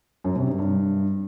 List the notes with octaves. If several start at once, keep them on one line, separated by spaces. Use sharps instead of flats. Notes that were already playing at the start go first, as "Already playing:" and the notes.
F#2
C3
G2
G2